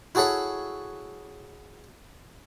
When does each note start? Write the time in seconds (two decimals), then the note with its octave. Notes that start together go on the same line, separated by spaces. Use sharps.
0.15 E4 F#4 G#4 A4 C#5 E5